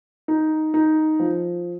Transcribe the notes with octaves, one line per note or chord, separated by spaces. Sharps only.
D#4
D#4
F3